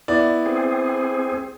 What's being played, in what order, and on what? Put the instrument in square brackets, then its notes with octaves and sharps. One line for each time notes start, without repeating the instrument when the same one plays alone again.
[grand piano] B3 E4 D5
[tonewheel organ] C4 G#4